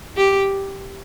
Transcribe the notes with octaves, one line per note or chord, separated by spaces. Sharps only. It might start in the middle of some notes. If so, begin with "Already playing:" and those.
G4